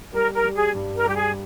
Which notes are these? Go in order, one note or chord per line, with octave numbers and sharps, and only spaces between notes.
G3 A#4
A#4
G3
G#4
G2
A#4
G3 G4
G#4